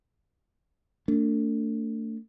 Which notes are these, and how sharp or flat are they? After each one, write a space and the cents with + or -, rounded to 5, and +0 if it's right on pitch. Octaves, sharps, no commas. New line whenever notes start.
A3 +35 D4 -20